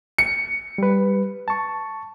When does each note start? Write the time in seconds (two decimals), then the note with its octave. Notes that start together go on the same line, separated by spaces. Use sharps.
0.18 C#7
0.78 G3 B4
1.48 A5 C#6